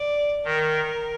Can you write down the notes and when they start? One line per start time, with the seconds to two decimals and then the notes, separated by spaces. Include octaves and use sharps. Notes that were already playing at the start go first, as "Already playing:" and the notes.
Already playing: D5
0.45 D#3 A#4